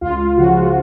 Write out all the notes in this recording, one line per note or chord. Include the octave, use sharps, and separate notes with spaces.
C#2 F4
C#3 F3 F#4